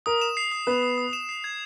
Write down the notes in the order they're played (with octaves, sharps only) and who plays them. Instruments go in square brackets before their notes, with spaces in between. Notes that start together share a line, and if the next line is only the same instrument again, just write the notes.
[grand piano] A#4 [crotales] D#6
[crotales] E7
C7
D#6
[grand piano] B3 B4 [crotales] D#6
[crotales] D#6
D#6
E7
C7
G#6